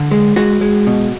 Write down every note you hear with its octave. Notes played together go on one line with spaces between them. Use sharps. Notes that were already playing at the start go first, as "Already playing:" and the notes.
Already playing: D3
G#3
G#3 F#4
G#3
B2